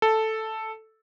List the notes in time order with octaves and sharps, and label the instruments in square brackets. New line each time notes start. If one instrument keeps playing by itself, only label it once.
[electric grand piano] A4